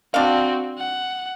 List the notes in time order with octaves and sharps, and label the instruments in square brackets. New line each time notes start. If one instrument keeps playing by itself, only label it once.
[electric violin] C4 F#4 [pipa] D4 F5
[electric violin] F#5